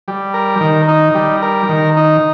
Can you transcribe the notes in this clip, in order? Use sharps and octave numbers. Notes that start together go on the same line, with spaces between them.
G3
A#4
D#3
D#4
G3
A#4
D#3
D#4